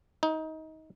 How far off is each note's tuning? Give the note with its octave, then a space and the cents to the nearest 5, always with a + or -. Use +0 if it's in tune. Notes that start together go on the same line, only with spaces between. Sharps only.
D#4 +25